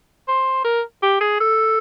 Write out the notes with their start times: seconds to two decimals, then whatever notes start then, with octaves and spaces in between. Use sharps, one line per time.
0.28 C5
0.64 A#4
1.03 G4
1.20 G#4
1.40 A4